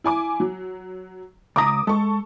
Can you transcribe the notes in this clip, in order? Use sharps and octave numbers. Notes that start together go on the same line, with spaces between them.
E4 G#5 D6
F#3
C#2 A#5 D6 D#6
G#3 A4 C#6